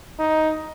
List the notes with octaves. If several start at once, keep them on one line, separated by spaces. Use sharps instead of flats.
D#4